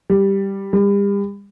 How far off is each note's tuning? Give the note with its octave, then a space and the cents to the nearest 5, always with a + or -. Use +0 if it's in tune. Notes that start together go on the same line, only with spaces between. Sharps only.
G3 +5
G3 +40